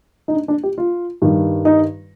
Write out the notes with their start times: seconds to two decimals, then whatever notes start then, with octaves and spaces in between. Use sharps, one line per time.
0.28 D#4
0.33 D4
0.48 D4
0.63 G4
0.78 F4
1.22 G2 D#3
1.65 D#4